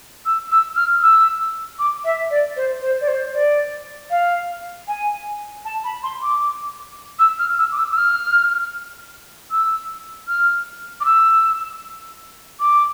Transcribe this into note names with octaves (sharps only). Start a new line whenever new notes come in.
E6
E6
F6
E6
D6
E5
D5
C5
C5
D5
C5
D5
F5
G#5
A5
B5
C6
D6
E6
F6
E6
D6
E6
E6
F6
E6
F6
D6
E6
D6